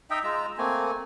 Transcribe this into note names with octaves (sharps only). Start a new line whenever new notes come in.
D#4 D#5 E5 G5
G#3 F4 A#5 E6
A3 A#3 C4 G#5